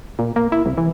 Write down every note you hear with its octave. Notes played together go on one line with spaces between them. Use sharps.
A#2
A#3
E4
C2
E3